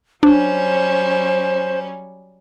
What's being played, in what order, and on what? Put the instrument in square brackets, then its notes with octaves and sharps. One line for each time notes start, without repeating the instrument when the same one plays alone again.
[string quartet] F#3 G3 C#4 [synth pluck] D4 [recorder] C5